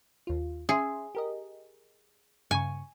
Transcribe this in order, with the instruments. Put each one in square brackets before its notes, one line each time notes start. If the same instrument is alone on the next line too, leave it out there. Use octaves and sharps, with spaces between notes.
[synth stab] D#2 F4
[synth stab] C#4 E5 C6 [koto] G#4
[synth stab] G4 A#4 D#5
[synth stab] G2 C#3 C#6 [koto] G#5